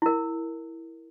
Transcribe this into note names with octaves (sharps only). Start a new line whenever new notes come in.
E4 A#4